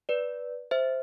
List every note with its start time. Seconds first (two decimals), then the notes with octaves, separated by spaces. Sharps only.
0.09 B4 D5
0.71 C5 E5